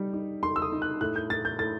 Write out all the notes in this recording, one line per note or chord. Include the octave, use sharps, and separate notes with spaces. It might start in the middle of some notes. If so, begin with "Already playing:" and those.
Already playing: G3 D#4
D#4
D#4 C6
E6
D#6
D#4
F#6
A2 F#6
G6
A2 A6
G6
A2 A6